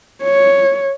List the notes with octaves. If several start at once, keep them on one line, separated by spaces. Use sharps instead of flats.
C#5